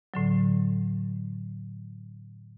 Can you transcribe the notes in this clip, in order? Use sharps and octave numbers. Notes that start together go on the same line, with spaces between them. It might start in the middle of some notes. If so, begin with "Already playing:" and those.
A2 D3 F#3